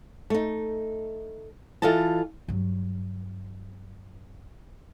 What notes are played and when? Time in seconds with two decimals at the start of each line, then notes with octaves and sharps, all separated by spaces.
0.30 A3 D#4
1.82 E3 F4 A4 D#5 A5
2.48 G2 F#3